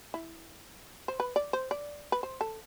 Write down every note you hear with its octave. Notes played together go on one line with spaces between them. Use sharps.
E4
C5
B4
D5
C5
D5
B4
C5
A4